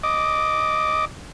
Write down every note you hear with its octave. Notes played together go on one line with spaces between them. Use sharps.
D#5 D6